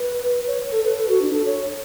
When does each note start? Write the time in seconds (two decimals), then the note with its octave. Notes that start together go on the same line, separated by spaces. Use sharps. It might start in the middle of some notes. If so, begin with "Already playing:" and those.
Already playing: B4
0.47 C#5
0.72 A4
0.84 B4
0.97 A4
1.09 F#4
1.22 D4
1.33 A4
1.46 C#5